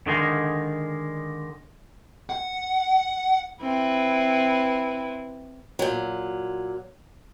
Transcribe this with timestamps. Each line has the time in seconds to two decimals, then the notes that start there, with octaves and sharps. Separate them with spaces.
0.07 D3 D#3 G#3
2.30 F#5
3.62 C4 E4 B4
5.79 A#2 F#3